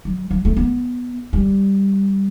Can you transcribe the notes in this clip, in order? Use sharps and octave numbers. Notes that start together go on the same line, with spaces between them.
F#3
F#3
A3
B3
G3